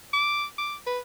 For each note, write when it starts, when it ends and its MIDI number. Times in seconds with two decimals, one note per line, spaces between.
0.13 0.45 86
0.58 0.75 86
0.87 0.99 71